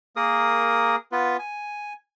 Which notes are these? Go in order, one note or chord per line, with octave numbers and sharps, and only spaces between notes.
A#3 G#4 A#4 D#6
B3 F4 B4
G#5